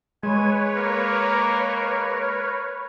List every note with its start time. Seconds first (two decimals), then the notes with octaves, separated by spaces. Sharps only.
0.23 G#3 B4 C#5 G#5
0.77 A#3 A#4